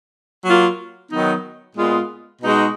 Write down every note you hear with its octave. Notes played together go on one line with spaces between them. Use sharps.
F#3 A#3 F4
D#3 F#3 B3 D#4
A#2 G#3 B3 F4
B2 G#3 D#4 F#4